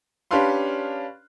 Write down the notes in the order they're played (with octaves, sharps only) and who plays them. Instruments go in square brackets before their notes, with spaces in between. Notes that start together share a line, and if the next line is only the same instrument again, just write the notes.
[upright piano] C#4 D4 G4 B4 F5 C6